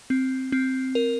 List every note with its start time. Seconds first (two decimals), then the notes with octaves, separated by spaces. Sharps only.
0.10 C4
0.52 C4
0.95 A#4